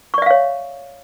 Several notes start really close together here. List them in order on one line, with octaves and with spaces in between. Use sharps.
C#6 D5 E5 F5 C#5